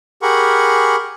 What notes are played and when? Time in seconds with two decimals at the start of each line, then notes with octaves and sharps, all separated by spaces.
0.22 G4 G#4 A#4 F#5 B5 C#6